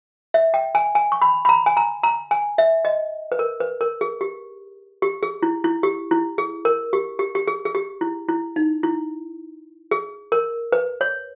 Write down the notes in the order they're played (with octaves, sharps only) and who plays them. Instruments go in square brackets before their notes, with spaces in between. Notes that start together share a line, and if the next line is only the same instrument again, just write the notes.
[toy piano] E5
G5
G#5
G#5
C#6
B5
B5
A#5
G#5
A#5
A#5
G#5
E5
D#5
B4
A#4
B4
A#4
G#4
G4
G4
G#4
E4
E4
G4
E4
G#4
A#4
G4
G4
G4
G#4
G#4
G4
E4
E4
D#4
E4
G#4
A#4
B4
C#5